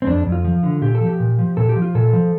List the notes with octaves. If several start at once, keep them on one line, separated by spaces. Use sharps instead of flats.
C4
F2 D4
F2
F4
F3
D3
A#2 G4
A4
F3
G4
A#2
F3
A#2 A4
G4
F3
F4
A#2 A4
F3